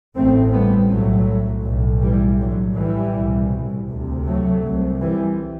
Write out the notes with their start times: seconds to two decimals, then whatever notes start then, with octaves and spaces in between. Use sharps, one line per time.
0.16 A1 A2 A3 C4
0.53 G3 B3
0.90 B1 A2 F#3 A3
1.64 B1 A2
2.02 E3 G3
2.40 A1 A2 D3 F#3
2.76 E3 G3
3.14 C2 B2
3.88 D2 C3
4.25 F#3 A3
4.63 C2 C3
5.01 E3 G3